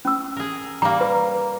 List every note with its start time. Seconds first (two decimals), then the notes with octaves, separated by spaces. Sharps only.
0.05 C#4 E6
0.37 G#4 A#4
0.82 G3 A#3 A#5
1.01 B4